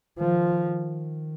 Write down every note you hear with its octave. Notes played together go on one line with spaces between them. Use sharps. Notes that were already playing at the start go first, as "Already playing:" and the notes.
D#3 F3